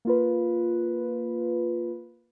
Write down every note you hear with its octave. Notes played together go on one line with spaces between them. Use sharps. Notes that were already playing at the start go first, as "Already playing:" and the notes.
A#3 F4 B4